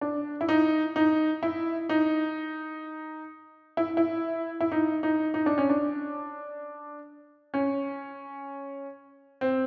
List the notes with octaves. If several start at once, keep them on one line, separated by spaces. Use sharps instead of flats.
D4
E4
D#4
D#4
E4
D#4
E4
E4
E4
D#4
D#4
D#4
D4
C#4
D4
C#4
C4